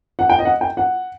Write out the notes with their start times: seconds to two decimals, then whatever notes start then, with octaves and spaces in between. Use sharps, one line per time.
0.19 F#5
0.29 G5
0.39 D#5
0.45 F#5
0.61 G5
0.77 F#5